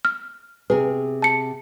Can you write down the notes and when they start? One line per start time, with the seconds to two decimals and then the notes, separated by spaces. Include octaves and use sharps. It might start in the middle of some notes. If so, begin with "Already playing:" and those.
0.05 F6
0.70 C3 G#4 B4
1.22 A5 C#7